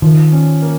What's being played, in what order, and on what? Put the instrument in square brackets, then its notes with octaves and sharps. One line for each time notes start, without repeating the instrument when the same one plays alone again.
[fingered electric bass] D#3 [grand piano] F3
[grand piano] C#4
A#3